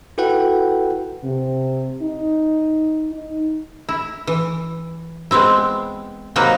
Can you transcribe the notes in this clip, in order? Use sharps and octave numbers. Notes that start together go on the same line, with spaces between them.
E4 F#4 A4 B4 F#5 G5
C3
D#4
D#4
E4
E3
G#3 B3 C4 E4
C3 F#3 A#3 D#4 A#4 B4